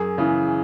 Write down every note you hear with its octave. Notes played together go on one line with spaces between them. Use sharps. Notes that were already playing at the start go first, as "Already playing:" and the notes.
Already playing: F#2 G#4
C#3 E3